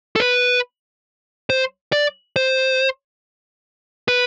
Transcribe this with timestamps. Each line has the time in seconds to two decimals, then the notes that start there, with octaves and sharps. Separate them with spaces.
0.16 A4
0.20 B4
1.50 C5
1.92 D5
2.36 C5
4.08 B4